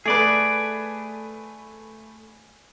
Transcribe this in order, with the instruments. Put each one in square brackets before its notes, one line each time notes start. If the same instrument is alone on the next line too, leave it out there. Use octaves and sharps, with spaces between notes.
[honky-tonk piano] A3 B4 [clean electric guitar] G#4 D5